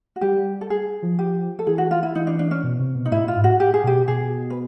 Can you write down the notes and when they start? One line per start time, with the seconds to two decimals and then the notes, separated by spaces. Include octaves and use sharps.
0.16 F#4
0.21 G3 G4
0.61 A4
0.70 G#4
1.03 F3
1.19 G4
1.59 A4
1.67 E3 G#4
1.78 F#4
1.91 F4
2.03 E4
2.15 E3 D#4
2.27 D4
2.39 D4
2.51 C#4
2.63 B2
2.79 C3
2.95 B2
3.05 D#4
3.11 A2 E4
3.24 A2
3.28 F4
3.35 G#2
3.44 A2 F#4
3.60 G4
3.74 G#4
3.84 B2 G4
4.08 B2 G#4
4.50 B4